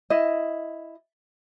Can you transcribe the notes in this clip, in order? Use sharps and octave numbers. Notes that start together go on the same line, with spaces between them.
E4 D#5